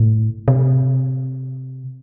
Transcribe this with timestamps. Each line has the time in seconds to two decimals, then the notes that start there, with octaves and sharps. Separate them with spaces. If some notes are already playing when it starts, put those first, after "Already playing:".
Already playing: A2
0.48 C3